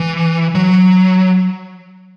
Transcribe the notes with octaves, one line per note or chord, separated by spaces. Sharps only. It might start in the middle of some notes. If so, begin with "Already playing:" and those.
Already playing: E3
F#3